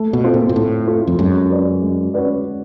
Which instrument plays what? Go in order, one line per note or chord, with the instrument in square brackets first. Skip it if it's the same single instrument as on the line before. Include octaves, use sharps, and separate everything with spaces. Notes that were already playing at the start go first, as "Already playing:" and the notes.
Already playing: [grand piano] A3
[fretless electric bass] B2
[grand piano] C4 F4 A4
[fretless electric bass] A#2
A#2
[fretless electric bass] A2 [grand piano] A3
[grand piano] C4 F4 A4
[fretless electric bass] F2
[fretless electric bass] F#2 [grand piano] G#3
[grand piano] C#4 F#4 B4 D5
G#3
C#4 F#4 B4 D5